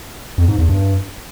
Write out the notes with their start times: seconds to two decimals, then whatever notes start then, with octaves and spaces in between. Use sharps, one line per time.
0.38 F2
0.48 G#2
0.59 E2
0.69 G2